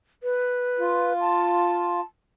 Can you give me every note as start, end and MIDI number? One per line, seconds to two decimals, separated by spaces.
0.23 1.13 71
0.79 2.01 65
1.21 2.02 81